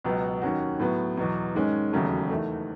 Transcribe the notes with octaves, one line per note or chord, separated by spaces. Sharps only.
C#2 B2 F#3 B3
D#2 D#3 F#3 C#4 F#4
A2 F#3 B3
E2 B2 F#3
G#2 D#3 G#3 C#4
E1 D#2 C#3 F#3 A3
E2 D#3 A3